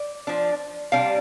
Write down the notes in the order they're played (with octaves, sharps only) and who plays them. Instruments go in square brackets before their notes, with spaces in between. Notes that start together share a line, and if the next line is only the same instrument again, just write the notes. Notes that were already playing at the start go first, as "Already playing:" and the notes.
Already playing: [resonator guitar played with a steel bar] D5
F3 D4
C3 G3 D4 F5